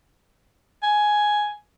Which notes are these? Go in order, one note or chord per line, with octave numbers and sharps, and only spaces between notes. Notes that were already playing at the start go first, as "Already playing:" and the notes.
G#5